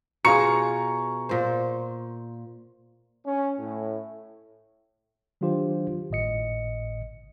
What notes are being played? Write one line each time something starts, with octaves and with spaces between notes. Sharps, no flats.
B2 F4 G#4 A#5 C#6 C#7
A#2 C5
C#4
A2
D#3 F#3 D4 F4 G4 C5
G#1 A2 D#5 C#7